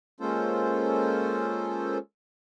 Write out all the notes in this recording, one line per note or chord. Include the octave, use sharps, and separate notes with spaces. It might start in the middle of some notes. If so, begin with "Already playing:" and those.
G#3 A#3 C#4 F4 A4 C5